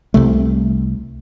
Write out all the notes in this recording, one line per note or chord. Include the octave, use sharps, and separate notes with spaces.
C2 C3 A3